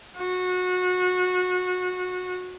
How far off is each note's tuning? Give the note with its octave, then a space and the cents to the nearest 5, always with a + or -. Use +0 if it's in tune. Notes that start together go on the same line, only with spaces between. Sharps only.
F#4 -25